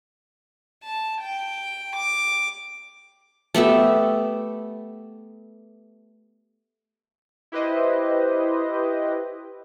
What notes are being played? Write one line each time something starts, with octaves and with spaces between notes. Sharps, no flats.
A5
G5
D6
A3 B3 G4 E5
E4 G4 B4 C5 D#5